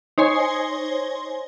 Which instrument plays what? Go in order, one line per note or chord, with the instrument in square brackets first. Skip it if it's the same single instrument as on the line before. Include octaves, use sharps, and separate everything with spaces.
[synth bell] D#4 C5 C#5 G#5 C6